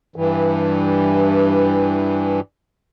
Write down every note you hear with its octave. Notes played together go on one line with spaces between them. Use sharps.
G2 E3